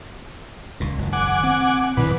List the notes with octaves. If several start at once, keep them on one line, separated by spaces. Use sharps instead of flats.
C#2 A#2
F#1 D#3
F#5 G#5 D6
C4
E2 A#2 D3 F3 B4